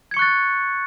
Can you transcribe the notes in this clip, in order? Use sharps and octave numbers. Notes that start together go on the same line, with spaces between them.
C#6 F#6 G#6 A6 C#7